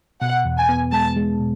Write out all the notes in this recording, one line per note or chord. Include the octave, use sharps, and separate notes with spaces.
B2 F#5
E2
G#5
B3
G#3 A5
G#3
B2